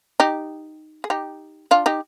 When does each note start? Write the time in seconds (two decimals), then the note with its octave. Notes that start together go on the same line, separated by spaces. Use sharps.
0.20 D#4 G4
1.04 G#4
1.10 D#4 G4
1.71 D4 F4
1.86 D#4 G4